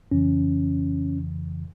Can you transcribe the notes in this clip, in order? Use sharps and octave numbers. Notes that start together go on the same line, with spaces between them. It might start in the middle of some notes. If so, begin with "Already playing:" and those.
F2 C#3 E3 C#4